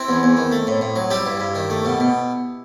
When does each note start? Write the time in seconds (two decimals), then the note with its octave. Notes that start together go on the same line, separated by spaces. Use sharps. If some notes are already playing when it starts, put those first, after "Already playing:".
Already playing: C4 E4
0.08 E2
0.23 E2
0.37 D#3
0.52 A3
0.67 A2
0.81 A2
0.96 F#3
1.11 G3 E4 G4
1.26 G2
1.40 G2
1.55 D#3
1.70 A3
1.85 B2
2.00 B2